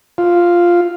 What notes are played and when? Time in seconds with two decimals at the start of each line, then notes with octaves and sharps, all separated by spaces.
0.18 F4